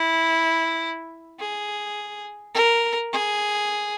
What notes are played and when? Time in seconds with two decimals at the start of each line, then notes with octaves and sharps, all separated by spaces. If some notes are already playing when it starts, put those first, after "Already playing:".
Already playing: E4
1.40 G#4
2.54 A#4
3.13 G#4